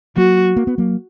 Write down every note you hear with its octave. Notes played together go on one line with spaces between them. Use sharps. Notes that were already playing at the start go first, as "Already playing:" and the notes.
F#3 A#3 F#4
A#3
B3
F#3 A#3